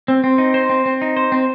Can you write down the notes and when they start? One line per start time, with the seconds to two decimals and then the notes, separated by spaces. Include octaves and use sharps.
0.08 C4
0.24 C4
0.38 D#4
0.54 C5
0.70 C4
0.86 C4
1.02 D#4
1.17 C5
1.32 C4